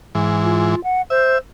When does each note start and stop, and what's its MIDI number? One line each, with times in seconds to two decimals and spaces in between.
0.15 0.75 44
0.15 0.75 52
0.43 0.83 65
0.84 1.02 78
1.10 1.37 72
1.10 1.38 76